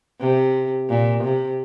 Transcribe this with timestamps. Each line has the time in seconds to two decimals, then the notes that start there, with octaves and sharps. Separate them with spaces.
0.20 C3
0.89 A#2
1.23 C3